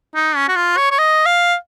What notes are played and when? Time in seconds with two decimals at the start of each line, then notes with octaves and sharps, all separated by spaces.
0.15 D#4
0.36 C#4
0.48 F#4
0.56 F4
0.77 C#5
0.91 C#5
0.98 D#5
1.26 F5